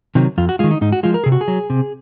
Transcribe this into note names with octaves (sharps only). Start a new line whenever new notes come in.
C3 D#3 F#3
F2 F4
F#4
D#3 G#3 F4
D#4
G#2 D#4
F#4
F3 G#3 F4
A#4
C3 G#4
F#4
G#4
F#3
C3